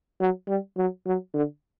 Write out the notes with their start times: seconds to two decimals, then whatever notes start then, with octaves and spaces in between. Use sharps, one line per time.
0.21 F#3
0.48 G3
0.78 F#3
1.07 F#3
1.34 D3